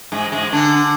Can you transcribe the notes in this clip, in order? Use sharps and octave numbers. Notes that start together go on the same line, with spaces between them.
G#2 G#3
G#2 G#3
D3 D4